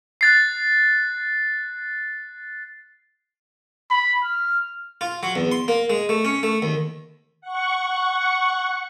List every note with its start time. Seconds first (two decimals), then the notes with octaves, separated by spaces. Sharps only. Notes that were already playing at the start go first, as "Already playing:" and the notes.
0.21 F#6 A6 C7
3.90 B5
4.24 F6
5.01 F4
5.23 F#3
5.35 E2
5.52 C6
5.68 A#3
5.90 G#3
6.09 A3
6.25 C#4
6.43 A3
6.62 D#2
7.41 F#5 C#6